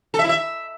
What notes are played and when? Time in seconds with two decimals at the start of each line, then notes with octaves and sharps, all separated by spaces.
0.14 A4
0.19 E5
0.24 E4
0.29 E5